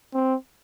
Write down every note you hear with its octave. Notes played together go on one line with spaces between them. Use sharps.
C4